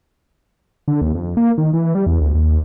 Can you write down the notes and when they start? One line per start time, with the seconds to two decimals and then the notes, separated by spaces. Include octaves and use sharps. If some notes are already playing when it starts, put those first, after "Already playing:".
0.88 D3
1.01 D#2
1.14 F2
1.37 A#3
1.58 D#3
1.73 E3
1.95 G3
2.07 E2
2.21 D2
2.34 D#2